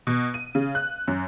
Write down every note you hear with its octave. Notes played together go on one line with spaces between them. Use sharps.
B2
D#7
C#3
F#6
F#2